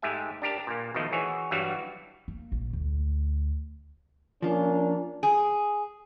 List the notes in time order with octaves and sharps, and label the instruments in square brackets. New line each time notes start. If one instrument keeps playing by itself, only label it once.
[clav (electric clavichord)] G#2 G#3 A3 G4 E5 G#5
D4 G4 A#4 A5
A#2 A#3
B2 D#3 F3 A3 D#4
E3 F#4 G#4 C#5
G2 E3 F#3 G3 F#4 F5
[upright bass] A#3
A#1
D2
[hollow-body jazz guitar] F3 F4 [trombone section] A#3 C#4 D4
[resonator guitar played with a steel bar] G#4